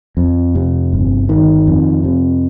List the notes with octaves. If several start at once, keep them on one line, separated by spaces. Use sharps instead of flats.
F2
C3
G1
D#3
F2
C3